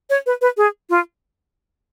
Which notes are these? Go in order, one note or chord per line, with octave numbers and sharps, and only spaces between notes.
C#5
B4
B4
G#4
F4